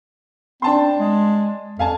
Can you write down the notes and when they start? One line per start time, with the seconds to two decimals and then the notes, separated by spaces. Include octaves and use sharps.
0.62 C4 D4 A5 C6
0.99 G#3
1.79 F2 F5 G#5 A5